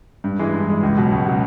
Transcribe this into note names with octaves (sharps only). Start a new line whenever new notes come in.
G2
E3 G#3
G2
E3 G#3
C#2
B2 F#3
C#2
B2 F#3